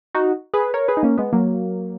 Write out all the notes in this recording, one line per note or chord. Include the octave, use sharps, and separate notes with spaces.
D#4 F#4
G#4 B4
A#4 C#5
G#4 B4
D#4
A#3 C#4
G#3 B3
F#3 A#3